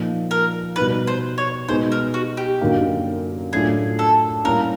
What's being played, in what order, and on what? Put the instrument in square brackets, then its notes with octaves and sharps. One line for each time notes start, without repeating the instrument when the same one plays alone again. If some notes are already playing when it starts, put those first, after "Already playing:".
Already playing: [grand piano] A#2 F3 A#3 D#4
[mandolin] A#4
[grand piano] B2 G3 B3 D#4 [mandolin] B4
[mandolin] C5
C#5
[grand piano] B2 G#3 B3 D#4 [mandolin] C5
[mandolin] A#4
F#4
G4
[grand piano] F#2 D3 F#3 A#3 D#4
[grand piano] A2 F#3 A3 D4 F4 [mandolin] G#4
[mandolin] A4
[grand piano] A#2 G3 A#3 C#4 E4 [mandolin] A#4